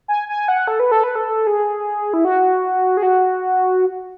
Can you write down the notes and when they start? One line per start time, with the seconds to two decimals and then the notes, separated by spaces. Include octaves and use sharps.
0.08 G#5
0.29 G#5
0.48 F#5
0.68 A4
0.80 B4
0.92 A4
1.04 B4
1.15 A4
1.47 G#4
2.14 E4
2.25 F#4
2.97 G#4
3.03 F#4